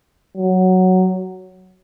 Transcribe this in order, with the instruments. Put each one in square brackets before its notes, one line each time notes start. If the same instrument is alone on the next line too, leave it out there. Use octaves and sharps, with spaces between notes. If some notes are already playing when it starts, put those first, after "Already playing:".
[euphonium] F#3